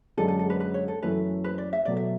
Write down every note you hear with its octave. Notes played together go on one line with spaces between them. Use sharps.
F#2 D3 G#3 D4 A4
A4
A4
B4
B4
C#5
A4
F#2 E3 A3 C#4 B4
B4
D5
E5
B2 F#3 A3 D5
E5